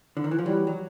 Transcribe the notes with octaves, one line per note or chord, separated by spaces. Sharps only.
D3
D#3
E3
F3
E3 F#3 G3
F#3